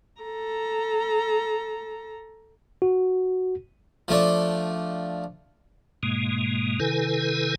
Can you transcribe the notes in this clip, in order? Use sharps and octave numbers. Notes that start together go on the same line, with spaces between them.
A4 A#5
F#4
F3 A3 D4
G#2 B2 G#3 A#3
C3 D#3 E4 A4 B4 G#5